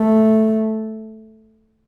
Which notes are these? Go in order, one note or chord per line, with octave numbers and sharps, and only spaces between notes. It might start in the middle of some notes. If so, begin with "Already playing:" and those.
Already playing: A3